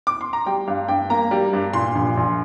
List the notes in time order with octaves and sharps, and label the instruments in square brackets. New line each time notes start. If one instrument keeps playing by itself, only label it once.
[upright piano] D6
C6
A#5
G3 G5
G2 F5
G2 G5
A#3 A#5
G3
G2
A#2 C6
A#1
A#1